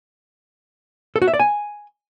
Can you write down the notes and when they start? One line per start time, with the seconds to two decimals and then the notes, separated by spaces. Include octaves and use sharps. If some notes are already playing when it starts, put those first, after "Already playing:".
1.16 A4
1.22 F#4
1.28 E5
1.34 D5
1.39 G#5